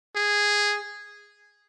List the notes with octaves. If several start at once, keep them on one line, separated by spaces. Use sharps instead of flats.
G#4